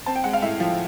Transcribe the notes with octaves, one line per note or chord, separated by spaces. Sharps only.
C4 A5
G5
G#3 F#5
F5
A2 E5
F3